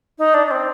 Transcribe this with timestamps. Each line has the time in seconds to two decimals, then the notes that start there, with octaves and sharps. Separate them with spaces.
0.18 D#4
0.34 D4
0.47 D4
0.51 C4